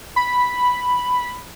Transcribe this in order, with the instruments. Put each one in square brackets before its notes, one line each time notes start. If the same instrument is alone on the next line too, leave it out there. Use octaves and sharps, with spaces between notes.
[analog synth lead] B5